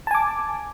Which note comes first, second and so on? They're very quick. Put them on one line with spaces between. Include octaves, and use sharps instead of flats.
A5 G#5 D6